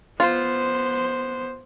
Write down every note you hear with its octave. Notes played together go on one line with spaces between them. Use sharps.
B3 F4 C5